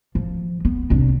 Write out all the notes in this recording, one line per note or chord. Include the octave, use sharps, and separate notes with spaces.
F3
B3
C2 D4